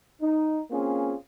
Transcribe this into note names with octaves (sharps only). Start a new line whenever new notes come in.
D#4
A#3 C4 C#4 F4 G#4